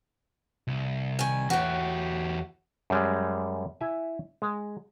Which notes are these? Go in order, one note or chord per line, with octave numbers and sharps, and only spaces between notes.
C2
D#3 G#5
E2 A2 F#4 G4
F#2 G3 G#3
E4 E5 G#5
G#3